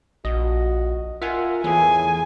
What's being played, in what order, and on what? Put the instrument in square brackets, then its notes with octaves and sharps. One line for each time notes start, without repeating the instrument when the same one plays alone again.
[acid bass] A#1 [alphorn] F#4 [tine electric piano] D#5
[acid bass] F4 [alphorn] A#4 [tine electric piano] E5 F#5 G#5
[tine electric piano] E2 G#4 [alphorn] A2 [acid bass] E3 [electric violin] G#5